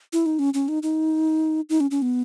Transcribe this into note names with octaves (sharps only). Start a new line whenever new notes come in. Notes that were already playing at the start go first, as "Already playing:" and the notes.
E4
D#4
C#4
C#4
D#4
D#4
D#4
C#4
C#4
B3